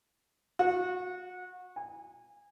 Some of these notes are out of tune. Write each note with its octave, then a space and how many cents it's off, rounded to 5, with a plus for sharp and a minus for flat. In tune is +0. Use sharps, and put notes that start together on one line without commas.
F#4 -30
G#5 -25